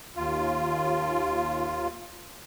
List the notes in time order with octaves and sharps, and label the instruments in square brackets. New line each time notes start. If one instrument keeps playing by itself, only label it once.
[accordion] D#2 F4